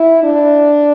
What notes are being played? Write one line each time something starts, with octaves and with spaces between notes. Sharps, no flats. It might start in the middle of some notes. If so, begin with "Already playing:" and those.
Already playing: E4
D4